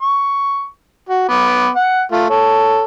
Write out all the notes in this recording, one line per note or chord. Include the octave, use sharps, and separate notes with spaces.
C#6
F#4
B3 D6
F#5
A3 F4
A4 C#5